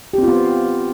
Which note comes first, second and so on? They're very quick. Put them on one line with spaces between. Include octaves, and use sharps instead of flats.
G4 C4 F4 B3